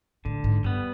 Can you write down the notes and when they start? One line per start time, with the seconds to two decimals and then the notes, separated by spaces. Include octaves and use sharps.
0.25 A2 D3
0.44 G#2
0.64 G2 G3 B3